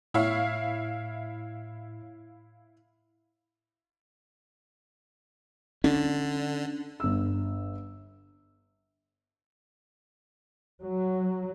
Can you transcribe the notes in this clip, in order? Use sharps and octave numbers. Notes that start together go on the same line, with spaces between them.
A2 E4 C#5 E5 F5
D3 C#4 D4
G1 E6
F#3